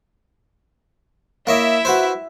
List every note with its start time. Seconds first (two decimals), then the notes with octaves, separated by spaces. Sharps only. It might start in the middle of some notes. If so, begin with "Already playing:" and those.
1.47 A#3 E4 C#5 D#5 E5
1.85 F#4 B4 C5